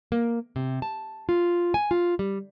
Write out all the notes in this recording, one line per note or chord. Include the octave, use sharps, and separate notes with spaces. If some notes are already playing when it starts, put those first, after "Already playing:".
A#3
C3
A5
F4
G#5
F4
G3